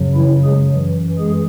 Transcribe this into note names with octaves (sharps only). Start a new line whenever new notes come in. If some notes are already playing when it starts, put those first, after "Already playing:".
Already playing: F#2 C#3 F#3
E3 E4
G#3 G#4
F#2 E3
G#3 G#4